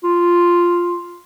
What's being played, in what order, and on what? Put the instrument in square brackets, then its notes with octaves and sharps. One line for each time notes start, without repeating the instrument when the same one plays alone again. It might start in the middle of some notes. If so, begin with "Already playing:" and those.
[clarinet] F4